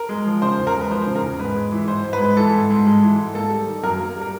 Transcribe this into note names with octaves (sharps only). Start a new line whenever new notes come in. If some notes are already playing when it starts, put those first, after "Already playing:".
Already playing: A#4
G#3
F3
C#3 C5
E2
A#4
G#3
B4
F3 C5
C#3
A#4
E2
G#2 B4
G#3
E3
G#2 C5
G#2
B4
G#3
E3 A4
G#2
G#2
G#3
E3
G#2
A#3 A4
G3
D#3
F#2 A#4
A#3
G3
A#4